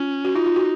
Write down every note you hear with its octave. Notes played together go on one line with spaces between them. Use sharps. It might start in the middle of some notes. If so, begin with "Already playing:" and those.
Already playing: C#4 F4
F#4
D#4 F4
F4
F#4